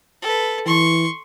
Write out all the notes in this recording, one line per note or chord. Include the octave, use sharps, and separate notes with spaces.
A4 B4
E3 C6 C#6